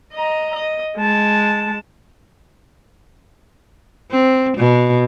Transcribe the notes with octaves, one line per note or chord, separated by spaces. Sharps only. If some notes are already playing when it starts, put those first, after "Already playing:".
D#5 A#5
D#5
G#3 A5
C4
B2